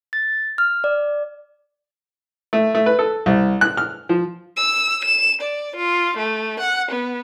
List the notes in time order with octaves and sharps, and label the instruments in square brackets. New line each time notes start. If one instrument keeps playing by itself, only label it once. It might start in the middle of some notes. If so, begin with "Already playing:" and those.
[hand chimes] A6
F6
D5
[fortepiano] A3
A3
B4
A4
C2
F#6
F6
F3
[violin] E6
E7
D5
F4
A3
F#5
B3